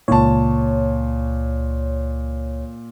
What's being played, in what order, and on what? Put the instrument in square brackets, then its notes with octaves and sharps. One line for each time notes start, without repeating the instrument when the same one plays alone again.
[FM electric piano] C#2 C#5 [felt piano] A#2 A5